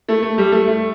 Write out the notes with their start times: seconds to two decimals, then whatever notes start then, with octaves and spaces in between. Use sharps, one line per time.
0.08 A3
0.22 A3
0.38 G3
0.52 A3
0.67 A3